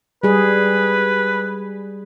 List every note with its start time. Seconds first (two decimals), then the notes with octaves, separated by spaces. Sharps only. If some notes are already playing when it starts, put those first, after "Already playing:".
0.23 G3 G#4 B4